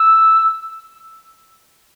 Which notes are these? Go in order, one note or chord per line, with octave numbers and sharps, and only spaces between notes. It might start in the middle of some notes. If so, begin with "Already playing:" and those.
Already playing: E6